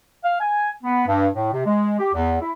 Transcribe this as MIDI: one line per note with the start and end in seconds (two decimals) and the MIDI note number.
0.24 0.39 77
0.41 0.69 80
0.84 1.04 59
1.07 1.28 43
1.34 1.48 45
1.53 1.62 48
1.66 1.97 56
1.99 2.09 67
2.14 2.39 40
2.42 2.52 64